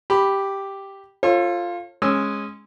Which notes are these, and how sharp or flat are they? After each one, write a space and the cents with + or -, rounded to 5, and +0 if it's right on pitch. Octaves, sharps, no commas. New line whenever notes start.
G4 +0 B5 +0
F4 +0 A4 +20 C#5 -45
G#3 +0 C#4 -15 E6 +0